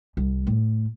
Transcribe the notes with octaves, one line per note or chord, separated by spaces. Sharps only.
C2
A2